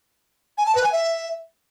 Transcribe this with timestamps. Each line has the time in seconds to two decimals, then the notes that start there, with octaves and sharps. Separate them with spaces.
0.58 G#5
0.66 A5
0.75 B4
0.84 G#5
0.92 E5